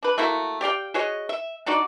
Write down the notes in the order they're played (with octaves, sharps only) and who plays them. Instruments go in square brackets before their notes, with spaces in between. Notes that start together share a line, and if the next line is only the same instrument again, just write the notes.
[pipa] D4 B4
A3 A#3 E4 F#4
G4 D5 F5 G5
F#4 G#4 C#5 D#5
E5
D4 D#4 F#4 D5